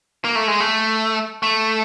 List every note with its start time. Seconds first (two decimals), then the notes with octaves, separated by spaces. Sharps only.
0.25 A#3
0.35 A3
0.48 G#3
0.60 A3
1.43 A3